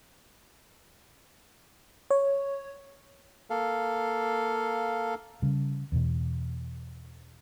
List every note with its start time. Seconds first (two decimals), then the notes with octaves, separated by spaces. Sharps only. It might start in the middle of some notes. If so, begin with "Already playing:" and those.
2.11 C#5
3.50 A#3 A4 F5
5.42 C#3 G3
5.92 E2 B2